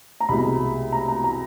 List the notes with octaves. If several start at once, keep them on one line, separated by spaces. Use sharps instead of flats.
A#5
C2 B2 G#3 B5
A#5
A#5
A#5